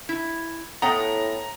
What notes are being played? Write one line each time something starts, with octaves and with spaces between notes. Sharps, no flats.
E4
A2 B3 F#5 G5 A#5